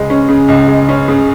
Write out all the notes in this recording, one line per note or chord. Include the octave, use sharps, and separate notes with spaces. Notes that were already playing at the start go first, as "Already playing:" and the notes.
Already playing: C#2 C#3 G#3
C#4
C#3
C#2
G#3
C#4
C#3